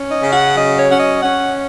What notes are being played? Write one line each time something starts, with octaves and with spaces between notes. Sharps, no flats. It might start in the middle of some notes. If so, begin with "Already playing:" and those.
Already playing: C#4
D#5
C#3
F#5
F#3 D#5
C#5
C#4 F#5
D#5
C#4 F#5